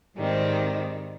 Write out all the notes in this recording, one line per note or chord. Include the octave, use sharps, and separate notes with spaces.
G#2 D#3 G3 C4